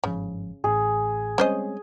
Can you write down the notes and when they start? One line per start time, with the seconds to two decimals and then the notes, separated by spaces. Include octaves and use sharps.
0.04 G1 G#2 C#3 F3
0.64 A1 A2 G#4
1.38 G3 G#3 C4 C#4 C5 D#5